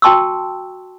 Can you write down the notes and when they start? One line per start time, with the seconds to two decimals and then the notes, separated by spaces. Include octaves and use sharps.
0.02 F#4 G5 A5 C6 C#6 E6